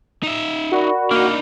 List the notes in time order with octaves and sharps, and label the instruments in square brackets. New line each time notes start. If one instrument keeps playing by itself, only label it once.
[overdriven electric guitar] D#4 E5
[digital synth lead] F#4 [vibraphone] A#4 D5 B5
[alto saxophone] A#3 [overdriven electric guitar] D4 D#4